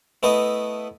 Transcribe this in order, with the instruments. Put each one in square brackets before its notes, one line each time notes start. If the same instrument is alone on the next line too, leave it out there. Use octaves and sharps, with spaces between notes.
[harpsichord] A3 B3 E4 B4 D#5